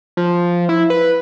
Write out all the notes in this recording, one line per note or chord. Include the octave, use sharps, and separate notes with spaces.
F3
E4
B4